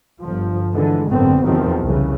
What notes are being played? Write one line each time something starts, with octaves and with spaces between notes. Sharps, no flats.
G1 F3
D3 E3 G#3
G#1 F#2 A2 D3 B3 C4
E2 C3 D#3 F3 F#3 C4
C2 C#3 E3